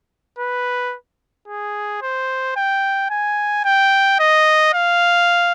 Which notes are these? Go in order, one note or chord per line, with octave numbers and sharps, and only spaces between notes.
B4
G#4
C5
G5
G#5
G5
D#5
F5